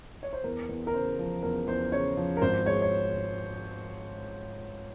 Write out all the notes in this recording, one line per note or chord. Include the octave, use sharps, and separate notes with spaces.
C#5
C5
E2 A#4
E2
A#4
C#3 C5
F3
E2 A#4
E2 C5
C#3 C#5
F3
A#4
G#1 C5
G#3 C#5
C#5